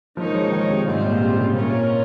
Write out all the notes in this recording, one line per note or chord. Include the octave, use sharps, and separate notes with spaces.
F3 G#3 D#4 A#4 C#5
F3
D#3
C3
G#2 G3 C4 F4 C5
A#2
C3
C3
C#3
A#2 C#4 F4 A#4 C#5